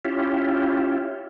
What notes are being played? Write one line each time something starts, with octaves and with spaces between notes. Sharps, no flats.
C#4 E4 F4 G4